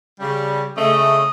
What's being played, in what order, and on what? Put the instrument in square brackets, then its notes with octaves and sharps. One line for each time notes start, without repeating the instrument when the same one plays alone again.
[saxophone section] C#3 G3
[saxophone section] C#3 A3 [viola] D#5